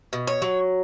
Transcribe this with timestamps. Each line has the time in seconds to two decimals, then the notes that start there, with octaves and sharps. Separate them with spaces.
0.13 B2
0.27 C#5
0.42 F#3